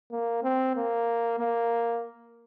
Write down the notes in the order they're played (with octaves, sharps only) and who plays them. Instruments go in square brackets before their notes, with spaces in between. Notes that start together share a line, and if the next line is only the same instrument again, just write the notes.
[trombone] A#3
C4
A#3
A#3